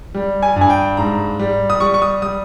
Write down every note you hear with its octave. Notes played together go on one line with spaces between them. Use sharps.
G3
G#5
G2
G#5
G5
G#2 A#5
G3
D#6
G3 C#6
C#6
D#6
G3 D#6